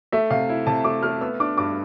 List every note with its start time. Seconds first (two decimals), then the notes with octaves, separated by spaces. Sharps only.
0.12 A3 E5
0.31 C3 F5
0.49 E4
0.67 C3 A5
0.84 A3 D6
1.03 A3 F6
1.21 B3 E6
1.40 D4 D6
1.58 G2 D6